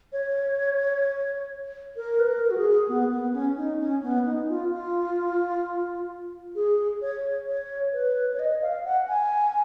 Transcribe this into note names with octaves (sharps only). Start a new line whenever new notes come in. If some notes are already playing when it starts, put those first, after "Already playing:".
C#5
A#4
B4
A#4
F#4
G#4
B3
B3
C#4
D#4
C#4
B3
D#4
F4
F4
G#4
C#5
C#5
B4
C#5
D#5
F5
F#5
G#5